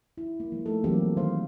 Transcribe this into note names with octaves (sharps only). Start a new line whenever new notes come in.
E4
A#3
F3 G#3
A3 D#4 A4
E3 F#3 G#3 A#3 C4 G4
D#3 C5 F5